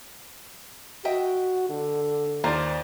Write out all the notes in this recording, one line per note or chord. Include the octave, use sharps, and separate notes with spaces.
F#4 D#5 E5 G5
D3
D#2 D4 F4 A#4 C5 D5